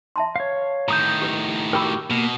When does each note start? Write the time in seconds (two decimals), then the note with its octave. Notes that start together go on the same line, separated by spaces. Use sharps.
0.16 E5 A5 C6
0.36 C#5 F5
0.88 A2 D#3 A#5 D#6 G6
1.22 G4 B4
1.73 F#4 G4 A#4 G5 B5 E6
2.10 B2 A#3 A#4